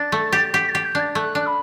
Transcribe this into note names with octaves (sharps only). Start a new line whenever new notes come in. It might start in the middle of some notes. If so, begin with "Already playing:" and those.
Already playing: D4 A6
A3
G4
G4 B6
A6
G4
G6
D4 A6
A3 F#6
D4
B5